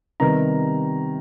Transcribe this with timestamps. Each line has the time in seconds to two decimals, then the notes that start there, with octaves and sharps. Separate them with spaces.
0.20 C3 D#3 G3 B3 A#5